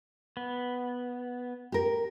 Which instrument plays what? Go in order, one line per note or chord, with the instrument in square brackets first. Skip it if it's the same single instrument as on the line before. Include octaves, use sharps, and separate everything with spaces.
[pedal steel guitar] B3
[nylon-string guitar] G4 A#4